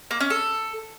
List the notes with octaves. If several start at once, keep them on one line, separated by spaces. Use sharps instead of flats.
A#3
C#4
A4